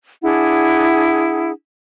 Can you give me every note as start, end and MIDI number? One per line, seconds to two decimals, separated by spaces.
0.22 1.51 62
0.22 1.51 64
0.22 1.51 68
0.22 1.51 78